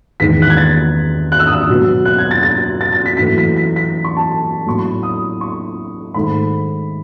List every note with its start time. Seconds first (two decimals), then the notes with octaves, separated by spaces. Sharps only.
0.20 E2 D#3 G#3 B6
0.42 F#6
0.50 G#6
0.57 A6
1.32 F#6
1.39 E6
1.46 D#6
1.53 E6
1.69 B2 F#3 B3
2.05 F#6
2.18 G#6
2.31 A6
2.43 A6
2.81 A6
2.92 A6
3.06 B6
3.17 F#2 E3 A3 B6
3.38 B6
3.56 B6
3.76 B6
4.04 C#6
4.17 A5
4.66 A2 F#3 B3 C#6
4.79 B5
5.03 D#6
5.41 C#6
6.14 G#2 D#3 A3 B5